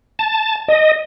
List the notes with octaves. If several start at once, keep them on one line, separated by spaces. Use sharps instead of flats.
A5
D#5